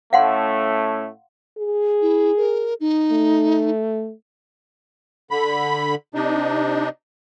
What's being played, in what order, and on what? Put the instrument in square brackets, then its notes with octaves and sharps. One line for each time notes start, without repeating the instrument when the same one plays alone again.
[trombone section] A2 A3 C#4 [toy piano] F5 F#5 C6
[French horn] G#4
[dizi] E4
A#4
D#4
[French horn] A3
[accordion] D3 B5
C3 D4 D#4